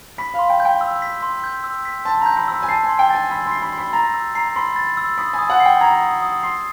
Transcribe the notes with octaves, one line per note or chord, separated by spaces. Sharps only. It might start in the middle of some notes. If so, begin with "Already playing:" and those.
B5 B6
F5
C6
G5
G6
G5
E6
B6
C6
G6
E6
B6
A5 C6
A#5 G6
B5
B5 E6
G#5
A5 C7
G#5
C6
G5
G#5 A6
B5 E6
C6
C7
B5
C6
B5
A#5 A6
E6
A#5 C7
B5 C6
A6
E6
B5 D#6
G#5
D#6
F#5
C7
G5
A#5 G#6
D#6
D#6
C6 C7